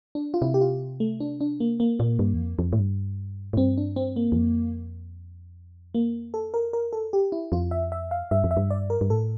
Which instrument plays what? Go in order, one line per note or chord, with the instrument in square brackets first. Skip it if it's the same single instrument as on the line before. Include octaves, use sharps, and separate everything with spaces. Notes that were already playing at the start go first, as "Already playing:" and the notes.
[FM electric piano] D4
F4
[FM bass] C3 [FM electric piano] E4
[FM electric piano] G4
F4
A3
D4
D4
A#3
A#3
[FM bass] A#2 [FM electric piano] A#3
[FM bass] G2
E2
F2
F2
A2
G2
A2
[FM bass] G2 [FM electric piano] C4
[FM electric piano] D4
C4
A#3
[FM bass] E2
F2
[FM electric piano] A#3
A4
A#4
A#4
A4
G4
E4
[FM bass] F2 [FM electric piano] F4
[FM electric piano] E5
E5
F5
[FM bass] G2 [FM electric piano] E5
[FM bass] F2
[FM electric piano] E5
[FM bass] G2
[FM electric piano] D5
A#4
[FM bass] G2
[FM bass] A2 [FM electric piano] A4